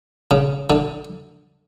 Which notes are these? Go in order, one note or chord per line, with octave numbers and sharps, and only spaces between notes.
C#3
D3